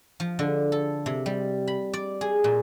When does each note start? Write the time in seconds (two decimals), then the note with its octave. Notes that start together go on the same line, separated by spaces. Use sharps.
0.20 F3
0.39 D3
0.72 A4
1.06 C3
1.26 G3
1.67 B5
1.93 D5
2.21 G#4
2.44 A#2